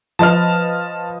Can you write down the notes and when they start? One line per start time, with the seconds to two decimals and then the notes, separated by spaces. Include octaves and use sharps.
0.19 F3 B4 D#5 A5 F6